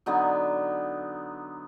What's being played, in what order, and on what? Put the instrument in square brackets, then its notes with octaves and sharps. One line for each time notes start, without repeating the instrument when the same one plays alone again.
[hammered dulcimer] D3 F#3 B3 D#4